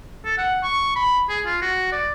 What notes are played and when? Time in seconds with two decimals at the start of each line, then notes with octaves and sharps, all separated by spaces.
0.25 A4
0.38 F#5
0.63 C#6
0.96 B5
1.29 G#4
1.46 F4
1.62 F#4
1.92 D5